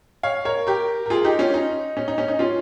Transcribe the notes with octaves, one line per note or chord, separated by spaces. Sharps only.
C#5 F5
A#4 C#5
G4 A#4
A#4
F4 G#4
D#4 G4
C#4 F4
D#4
C#4
D#4
C#4
D#4
C#4 F4